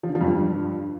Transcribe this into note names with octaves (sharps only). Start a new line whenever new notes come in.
F3
D3
F3
F2
G2